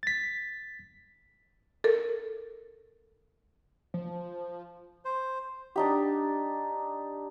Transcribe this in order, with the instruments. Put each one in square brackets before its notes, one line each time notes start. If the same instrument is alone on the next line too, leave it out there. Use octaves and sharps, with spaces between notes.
[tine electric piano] A6 B6
[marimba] A4 A#4
[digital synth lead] F3
[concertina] C5
[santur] D4 D#4 G4